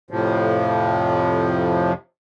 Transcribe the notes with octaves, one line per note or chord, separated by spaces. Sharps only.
F2 A2 C3 F3